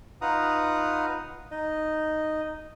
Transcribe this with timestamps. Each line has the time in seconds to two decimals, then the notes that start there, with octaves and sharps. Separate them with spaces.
0.22 D#4 F4 B4 F#5 A#5 D#6
1.51 D#4 D#5